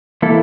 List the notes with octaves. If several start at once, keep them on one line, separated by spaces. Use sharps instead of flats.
E3 A#3 E4 A4